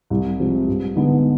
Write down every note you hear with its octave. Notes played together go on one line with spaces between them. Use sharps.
C2
C3 F3 G#3
G2
D3 G#3 B3 D#4